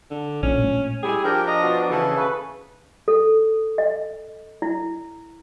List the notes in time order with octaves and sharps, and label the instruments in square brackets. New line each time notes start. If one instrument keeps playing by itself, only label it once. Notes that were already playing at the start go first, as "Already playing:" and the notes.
[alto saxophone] D3
[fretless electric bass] A#1 A#2 D4 [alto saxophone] C#4
[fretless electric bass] A#2 A3
[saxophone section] G3 E4 G#4 [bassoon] G4
[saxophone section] F3 D4 [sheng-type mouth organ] A#4 G5
[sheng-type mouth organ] D#5 A#5
[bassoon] B2
[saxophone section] C#3 E3 [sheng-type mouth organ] A4
[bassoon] C#3 [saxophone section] B4
[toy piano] A4
D#5
E4